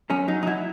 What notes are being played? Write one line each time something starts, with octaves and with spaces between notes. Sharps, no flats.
F#2 C#4
F#3 D#4
D#4
F#3 E4